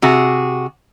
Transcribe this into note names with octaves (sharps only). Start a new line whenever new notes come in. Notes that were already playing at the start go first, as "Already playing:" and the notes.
C3 F#4 G#4